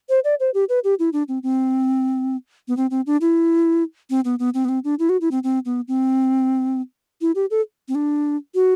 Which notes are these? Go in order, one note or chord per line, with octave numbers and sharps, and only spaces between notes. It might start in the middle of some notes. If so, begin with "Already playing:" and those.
C5
D5
C5
G4
B4
G4
E4
D4
C4
C4
B3
C4
C4
D4
E4
C4
B3
B3
C4
B3
C4
D4
E4
F#4
E4
C4
C4
B3
C4
E4
G4
A4
C4
D4
F#4